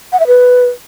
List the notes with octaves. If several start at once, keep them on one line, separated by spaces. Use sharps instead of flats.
F#5
E5
B4